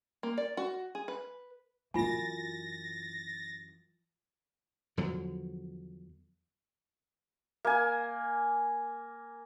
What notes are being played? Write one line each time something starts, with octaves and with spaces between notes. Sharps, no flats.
A#3
D5
F#4
G#4
B4
F#2 E3 F4 G#5 A6 A#6
E2 D3 F3 F#3
A#3 G#5